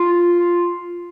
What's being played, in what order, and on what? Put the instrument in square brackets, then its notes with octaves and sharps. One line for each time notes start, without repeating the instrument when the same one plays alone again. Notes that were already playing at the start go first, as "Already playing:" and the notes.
Already playing: [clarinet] F4